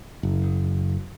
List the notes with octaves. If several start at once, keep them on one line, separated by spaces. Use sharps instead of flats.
F#1